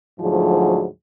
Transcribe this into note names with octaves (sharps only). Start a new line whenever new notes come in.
D2 G#2 F3 F#3 G#4